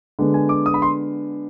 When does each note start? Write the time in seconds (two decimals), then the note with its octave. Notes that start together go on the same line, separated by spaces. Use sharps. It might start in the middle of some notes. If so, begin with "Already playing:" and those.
0.19 D3 G#3 B3
0.34 G#5
0.49 D6
0.66 D#6
0.74 B5
0.82 C6